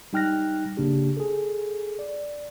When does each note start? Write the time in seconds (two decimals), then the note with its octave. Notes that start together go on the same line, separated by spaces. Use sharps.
0.13 G3 D#4 G5 F6 F#6 A#6
0.77 G#1 C#3 A#3 D4 G4
1.17 G#4 A4
1.99 D5